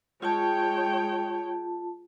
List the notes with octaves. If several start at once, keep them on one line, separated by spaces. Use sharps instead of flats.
G#3 F4 C#5 G5 A5